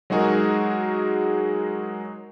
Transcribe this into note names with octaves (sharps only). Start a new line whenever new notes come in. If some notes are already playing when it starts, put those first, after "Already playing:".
F#3 G#3 D#4 F#4 G#4 A#4